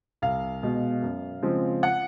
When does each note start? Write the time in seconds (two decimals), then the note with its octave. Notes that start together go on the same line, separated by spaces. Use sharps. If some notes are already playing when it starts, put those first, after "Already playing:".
0.22 C2 F5
0.63 B2 G#3 B3
1.02 F#2
1.43 C#3 F3 G#3 C4
1.83 F#5